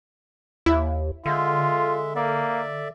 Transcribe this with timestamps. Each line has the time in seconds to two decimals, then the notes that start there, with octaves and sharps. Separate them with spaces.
0.66 D#2 E4
1.26 D3 G#3 F4 E5
2.16 A#3 D5 E5